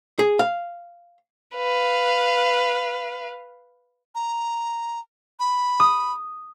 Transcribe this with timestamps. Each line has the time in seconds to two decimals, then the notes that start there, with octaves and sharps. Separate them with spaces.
0.19 G#4
0.39 F5
1.56 B4 F5
4.15 A#5
5.39 B5
5.80 D#6